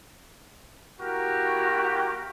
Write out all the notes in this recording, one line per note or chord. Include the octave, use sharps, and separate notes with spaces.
A#3 E4 F#4 G4 A#4